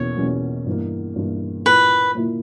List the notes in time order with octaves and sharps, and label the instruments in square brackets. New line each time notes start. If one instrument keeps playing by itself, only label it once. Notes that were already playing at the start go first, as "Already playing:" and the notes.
Already playing: [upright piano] E2 B2 A#3 C#4 [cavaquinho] C#5
[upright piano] E2 B2 A#3 C#4
G2 E3 A#3
G2 E3 A#3
[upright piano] A#2 A#3 E4 [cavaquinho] B4
[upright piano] A#2 A#3 E4